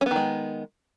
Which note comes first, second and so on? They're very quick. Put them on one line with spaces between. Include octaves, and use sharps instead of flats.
C#4 B3 D#3 G#3